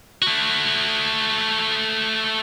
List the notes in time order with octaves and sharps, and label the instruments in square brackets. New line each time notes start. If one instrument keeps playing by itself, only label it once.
[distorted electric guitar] A3 F#4